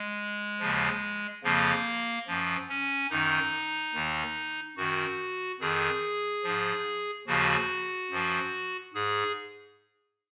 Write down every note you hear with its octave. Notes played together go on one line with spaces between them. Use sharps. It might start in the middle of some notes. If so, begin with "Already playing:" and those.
Already playing: G#3
D#2 C#3 F3
F2 C#3 F3 A#3
F#2 F3
C#4
F#2 D#3 D#4
D#2 D#3
F#2 D#3 F#4
F2 D#3 G#4
G#2 F3
D#2 C#3 F3 F#4
F#2 F3
G#2 G#4